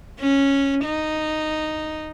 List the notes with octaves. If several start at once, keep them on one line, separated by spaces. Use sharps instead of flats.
C#4
D#4